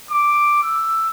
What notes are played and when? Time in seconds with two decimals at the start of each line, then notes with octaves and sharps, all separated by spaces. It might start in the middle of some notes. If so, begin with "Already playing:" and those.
0.10 D6
0.63 E6